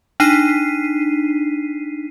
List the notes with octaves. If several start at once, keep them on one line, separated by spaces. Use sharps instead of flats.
D4 D#4 B6 C7 D#7